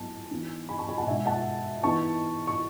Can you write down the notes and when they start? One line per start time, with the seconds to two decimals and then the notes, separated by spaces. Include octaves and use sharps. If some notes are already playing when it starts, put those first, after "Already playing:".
Already playing: A2 F#3 B3 G#5 A5
0.31 E3 B3 D#4
0.69 G#5 B5
0.78 A5 C#6
0.89 G#5 B5
0.98 F#5 A5
1.07 B2 G#3 D#4 E5 G#5
1.26 F#5 A5
1.83 E3 B3 D#4 A5 C#6
2.47 C#6